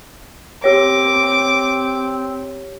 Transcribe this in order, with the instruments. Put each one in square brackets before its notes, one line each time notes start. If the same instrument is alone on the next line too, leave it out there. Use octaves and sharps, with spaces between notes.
[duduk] C4 [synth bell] G4 C#5 [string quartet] D6